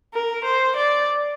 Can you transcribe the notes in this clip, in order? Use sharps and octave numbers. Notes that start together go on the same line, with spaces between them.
A#4
C5
D5